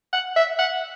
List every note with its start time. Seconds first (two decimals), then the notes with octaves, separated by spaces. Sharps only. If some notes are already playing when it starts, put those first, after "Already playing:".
0.13 F#5
0.36 E5
0.58 F#5